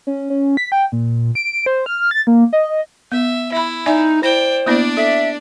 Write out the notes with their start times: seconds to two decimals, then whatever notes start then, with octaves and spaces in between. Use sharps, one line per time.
0.07 C#4
0.30 C#4
0.57 B6
0.72 G5
0.92 A#2
1.35 D7
1.66 C5
1.86 F6
2.11 A6
2.27 A#3
2.53 D#5
3.12 B3 E5
3.52 E4 E5 B5
3.86 D#4 D5 E5 G#5
4.23 E4 C5 D5 G5
4.66 A#3 B3 D4 E4 D5
4.97 A4 E5